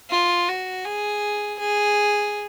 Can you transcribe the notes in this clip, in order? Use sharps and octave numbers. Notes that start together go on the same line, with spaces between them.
F4
F#4
G#4
G#4